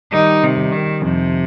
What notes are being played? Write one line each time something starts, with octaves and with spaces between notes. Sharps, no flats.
D#3 G3 D#4
C3
D#3 G3
D#3
F2 C3